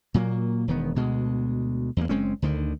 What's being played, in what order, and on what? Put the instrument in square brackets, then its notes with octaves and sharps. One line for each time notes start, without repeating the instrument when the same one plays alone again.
[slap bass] A#2 F#3 A3 A#3
E1 D#3 B3
D2 B2 G#3
E2 G2 A#3
F#1 G#3 C4 C#4
D2 D3 D#3